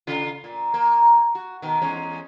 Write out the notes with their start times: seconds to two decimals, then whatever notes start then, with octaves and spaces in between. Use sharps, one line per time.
0.07 C#3 F4
0.44 A#2
0.74 A#3
1.35 F#4
1.62 B2 D#3
1.82 E2 G#3 C#4